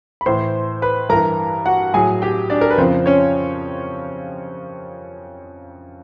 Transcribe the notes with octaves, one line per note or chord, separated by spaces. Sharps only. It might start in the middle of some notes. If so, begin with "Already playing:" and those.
B5
A2 E3 C5 C6
B4 B5
G2 E3 A#4 A#5
F#4 F#5
A2 F#3 G#4 G#5
G4 G5
D4 D5
A#4
B4
F2 C#3 F3 C4 C5
C#4 C#5